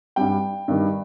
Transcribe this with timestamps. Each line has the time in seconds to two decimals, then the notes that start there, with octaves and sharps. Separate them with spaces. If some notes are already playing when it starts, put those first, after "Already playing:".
0.16 G2 G3 G5
0.68 G2 D#3 G3